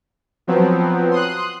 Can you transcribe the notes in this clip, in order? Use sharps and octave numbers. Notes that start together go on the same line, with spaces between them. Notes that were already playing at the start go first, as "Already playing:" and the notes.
F3 F#3 B3 C4
C6 D#6 F#6